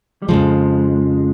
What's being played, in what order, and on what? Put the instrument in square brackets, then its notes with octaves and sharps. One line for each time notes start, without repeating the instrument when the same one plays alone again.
[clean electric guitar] G3
[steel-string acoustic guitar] F2 C#3 F3 [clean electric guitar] G#3